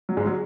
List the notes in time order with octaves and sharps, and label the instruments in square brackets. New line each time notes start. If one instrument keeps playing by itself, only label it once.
[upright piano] F#3
G#2 G#3
F#3